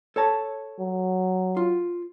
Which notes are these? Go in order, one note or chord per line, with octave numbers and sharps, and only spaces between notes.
A4 C#5 A5
F#3
F4